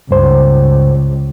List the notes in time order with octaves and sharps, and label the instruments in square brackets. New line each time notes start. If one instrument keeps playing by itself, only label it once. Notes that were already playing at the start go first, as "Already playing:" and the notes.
[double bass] C#2 [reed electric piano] G2 C5